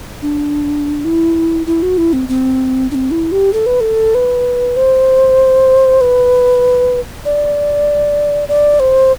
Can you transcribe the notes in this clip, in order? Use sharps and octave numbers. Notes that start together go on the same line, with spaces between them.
D4
E4
E4
F#4
E4
C4
C4
D4
C4
E4
G4
A4
B4
A4
B4
C5
B4
D5
D5
C5